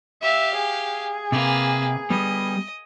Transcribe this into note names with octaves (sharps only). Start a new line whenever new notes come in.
G4 E5 F5
G#4
C3 A#3 B4
G3 B3 D#5